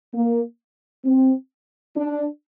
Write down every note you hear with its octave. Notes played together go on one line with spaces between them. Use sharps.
A#3
C4
D4